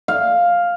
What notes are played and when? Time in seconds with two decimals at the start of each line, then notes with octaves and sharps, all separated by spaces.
0.08 F5